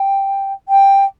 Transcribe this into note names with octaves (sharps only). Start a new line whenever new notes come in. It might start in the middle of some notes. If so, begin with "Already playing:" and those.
Already playing: G5
G5